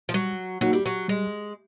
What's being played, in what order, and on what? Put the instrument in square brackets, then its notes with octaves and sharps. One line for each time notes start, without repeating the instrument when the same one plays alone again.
[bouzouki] F3
[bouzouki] F#3 [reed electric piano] G3
[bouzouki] F#3 [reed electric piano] A#3 D#4 F#4
[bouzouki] G3
F#3
[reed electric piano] G3 [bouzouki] G#3